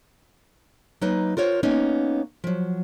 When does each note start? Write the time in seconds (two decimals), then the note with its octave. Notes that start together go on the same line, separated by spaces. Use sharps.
1.01 F#3 A#3 D#4 B4
1.37 F4 A#4 C5 C#5
1.63 A#3 B3 C#4 D#4
2.44 F3 F#3